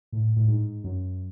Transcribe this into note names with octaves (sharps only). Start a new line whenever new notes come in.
A2
A2
G#2
F#2